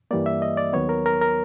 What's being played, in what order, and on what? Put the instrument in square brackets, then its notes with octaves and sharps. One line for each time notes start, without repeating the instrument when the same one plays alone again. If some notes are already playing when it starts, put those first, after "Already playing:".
[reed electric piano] G2 E3 G3 A#3 D5
E5
D#5
D5
D#2 D#3 F#3 B3 C#5
A#4
A#4
A#4